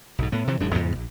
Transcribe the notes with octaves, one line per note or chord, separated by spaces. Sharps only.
B1 G#2
A2 B3
C3 E3 F3
D1 F#2 G#3 D4
E2 G#2 C#3 B3
A#1